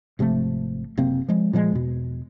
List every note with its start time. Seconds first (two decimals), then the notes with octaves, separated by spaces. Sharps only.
0.19 G#1 C3 F3 A3
0.97 F#1 C3 A#3 C4
1.28 F3 G#3
1.53 A#2 F3 G3 G#3
1.72 E2 B2